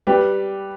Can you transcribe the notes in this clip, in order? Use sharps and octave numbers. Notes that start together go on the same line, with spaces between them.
G3 G4 B4